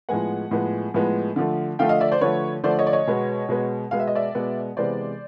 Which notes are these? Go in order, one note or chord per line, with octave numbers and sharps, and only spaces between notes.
A2 F3 G#3 B3 F#5 G#5
A2 F3 G#3 B3
A2 F3 G#3 B3
D3 F3 A3
D3 F3 A3 F5 G5
D#5 F5
D5 E5
C5 D5
D3 F3 A3 B4 C#5
D3 F3 A3 C5 D5
C#5 D#5
D5
C#5 D#5
B2 G#3 B3
B2 G#3 B3
B2 G#3 B3 F5
E5
D#5
D5 E5
B2 G#3 B3
C3 E3 G#3 B3 C5 D5